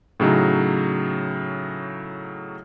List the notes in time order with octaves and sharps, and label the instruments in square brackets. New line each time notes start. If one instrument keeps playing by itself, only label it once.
[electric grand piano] A2 C#3 F#3 D#4